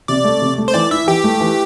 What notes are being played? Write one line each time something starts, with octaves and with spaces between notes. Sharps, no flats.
C3 D5
A3
C3
A3
C5
E3 D5
E4 E5
E3 G4
A3
E3